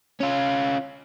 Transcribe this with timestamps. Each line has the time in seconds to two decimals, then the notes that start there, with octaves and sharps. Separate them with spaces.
0.20 C#4 F4